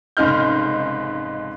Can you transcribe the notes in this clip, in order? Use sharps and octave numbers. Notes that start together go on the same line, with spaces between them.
F1 G#2 C#3 D#4 F6 G6